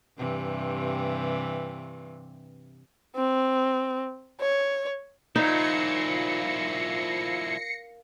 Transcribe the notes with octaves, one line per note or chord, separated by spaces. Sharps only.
G2 C3 E3
C4
C#5
A#2 F3 D#4 E4 A#6 C7 C#7